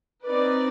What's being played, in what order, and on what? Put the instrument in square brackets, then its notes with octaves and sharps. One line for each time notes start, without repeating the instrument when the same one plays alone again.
[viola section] C4 D#4 B4 D5